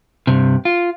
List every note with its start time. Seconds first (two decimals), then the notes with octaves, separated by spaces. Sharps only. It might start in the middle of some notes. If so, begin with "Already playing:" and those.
0.27 G2 C3
0.65 F4